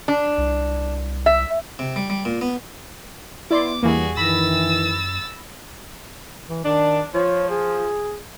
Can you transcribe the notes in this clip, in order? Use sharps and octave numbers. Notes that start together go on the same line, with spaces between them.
D4
C2
E5
C3
G3
G3
A#2
B3
B3 E4 D5 C6 D6
E2 G2 E3 A#3 F#4 G#4
F#2 D#3 E3 B5 E6 A6 A#6
E3
D#3 D4
F3 C#5
G#4